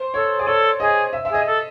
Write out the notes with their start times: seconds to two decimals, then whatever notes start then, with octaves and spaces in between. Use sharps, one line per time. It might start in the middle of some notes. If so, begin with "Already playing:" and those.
Already playing: C5
0.14 A4 C#5
0.39 G#4 D5
0.47 A4 C#5
0.80 G#4 D#5
1.13 E5
1.25 E5
1.29 G#4
1.34 D#5
1.46 A4